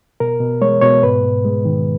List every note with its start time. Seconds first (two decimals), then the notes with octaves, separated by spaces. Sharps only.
0.20 B2 A#4
0.40 B2
0.62 G#3 C#5
0.81 B2 C#5
1.03 G#2 B4
1.23 G#2
1.45 G#3
1.65 D#3